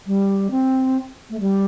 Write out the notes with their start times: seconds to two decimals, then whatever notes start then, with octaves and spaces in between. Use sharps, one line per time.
0.06 G3
0.50 C4
1.30 A3
1.39 G3